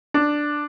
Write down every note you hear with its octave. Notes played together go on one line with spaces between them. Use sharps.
D4